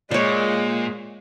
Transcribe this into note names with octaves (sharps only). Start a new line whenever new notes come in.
A#2 G#3 C#5 D5